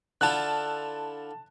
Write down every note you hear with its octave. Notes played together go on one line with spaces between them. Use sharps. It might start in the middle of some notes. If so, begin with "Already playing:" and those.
D3 E4 F4 A5 F#6